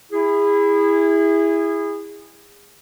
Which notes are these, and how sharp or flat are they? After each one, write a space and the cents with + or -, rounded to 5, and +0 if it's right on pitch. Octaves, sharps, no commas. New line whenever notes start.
E4 +0 G#4 -25